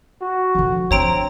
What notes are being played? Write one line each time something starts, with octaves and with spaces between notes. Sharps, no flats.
F#4
D3 F3
F3 C4 D4 C#5 A#5 D7